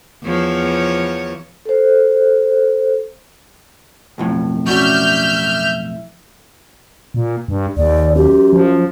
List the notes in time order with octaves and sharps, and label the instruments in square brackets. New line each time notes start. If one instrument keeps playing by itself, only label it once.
[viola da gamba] E2 F3 C#5
[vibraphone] A4 C5
[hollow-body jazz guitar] B1 F2 A2
[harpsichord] C#4 D4 F#4 [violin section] E5 F6 G6
[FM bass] A#2
G2
[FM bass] D#2 [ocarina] D5
[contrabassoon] F#2 [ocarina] G4
[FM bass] F3